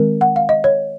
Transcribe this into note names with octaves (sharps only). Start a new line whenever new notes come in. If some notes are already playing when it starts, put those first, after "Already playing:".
Already playing: D#3 G#3 C4 A#4
F#5
F5
D#5
C#5